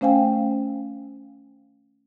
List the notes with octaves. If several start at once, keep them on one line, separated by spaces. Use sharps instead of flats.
A3 C#4 C5 F5 G5 G#5